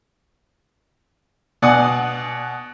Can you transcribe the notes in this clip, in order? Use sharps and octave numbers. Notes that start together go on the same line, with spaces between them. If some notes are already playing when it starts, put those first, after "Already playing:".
B2 D5 F#5 G#5 D#6